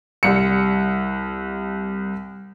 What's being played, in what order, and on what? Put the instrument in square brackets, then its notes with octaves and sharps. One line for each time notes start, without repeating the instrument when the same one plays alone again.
[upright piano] C2 C#7